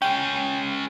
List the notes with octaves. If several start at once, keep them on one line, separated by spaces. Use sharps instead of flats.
G#3 C#4 G5